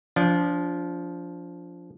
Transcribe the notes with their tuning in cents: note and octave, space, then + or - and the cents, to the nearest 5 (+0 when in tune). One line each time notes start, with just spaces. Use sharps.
F3 +0 D4 -25